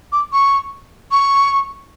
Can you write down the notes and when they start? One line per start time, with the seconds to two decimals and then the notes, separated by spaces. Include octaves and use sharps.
0.12 D6
0.33 C#6
1.11 C#6